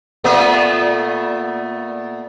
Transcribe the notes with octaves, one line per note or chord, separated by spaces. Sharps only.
A#2 A3 B3